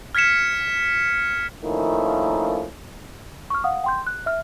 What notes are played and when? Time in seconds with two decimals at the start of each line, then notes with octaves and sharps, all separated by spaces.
0.15 F6 G#6 B6 C#7 E7
1.62 D#3 F3 A3 A#3 C#4 E4
3.50 C#6 F6
3.64 F5 F#5 D#6
3.84 G5 C6 G6
4.07 F#6
4.26 E5 F6